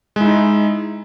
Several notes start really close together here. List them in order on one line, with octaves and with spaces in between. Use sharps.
G#3 E4 D#4